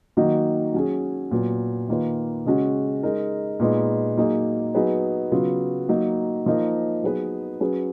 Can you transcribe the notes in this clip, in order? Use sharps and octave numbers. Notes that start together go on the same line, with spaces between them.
D#3 F#3 A#3 D#4 F#4
F#3 C#4 G#4
A#2 F#3 B3
D#3 A#3 F4 B4
C#3 G#3 C#4 F#4
G#3 D#4 A#4
A#2 G#3 B3 D#4
F#3 A#3 D#4 G#4
F#3 B3 D#4 G#4 B4
C#3 F#3 B3 F4
F#3 A#3 D#4
F3 A#3 D#4 A#4
F#3 B3 D#4 G#4 B4
F#3 C#4 G#4 B4